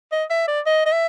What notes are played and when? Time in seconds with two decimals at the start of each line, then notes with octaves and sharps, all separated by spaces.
0.12 D#5
0.30 E5
0.48 D5
0.66 D#5
0.86 D#5
0.92 E5